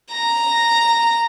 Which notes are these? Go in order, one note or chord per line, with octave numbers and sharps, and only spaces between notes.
A#5